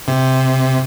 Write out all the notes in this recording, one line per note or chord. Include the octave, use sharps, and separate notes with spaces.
C3